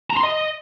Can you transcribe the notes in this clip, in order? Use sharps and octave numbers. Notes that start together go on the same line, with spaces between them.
A#5
C6
D#5